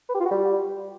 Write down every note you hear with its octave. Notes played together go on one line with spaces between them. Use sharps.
B4
G4
F4
F#4
G3